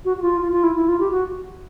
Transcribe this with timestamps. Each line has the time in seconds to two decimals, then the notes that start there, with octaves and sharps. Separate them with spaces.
0.05 F#4
0.17 F#4
0.22 F4
0.41 F4
0.52 F4
0.63 E4
0.76 E4
0.88 F4
1.00 G4
1.11 F#4